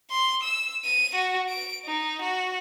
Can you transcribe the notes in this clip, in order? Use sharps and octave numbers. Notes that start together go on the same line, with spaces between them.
C6
E6
D#7
F#4
D7
D#4
F#4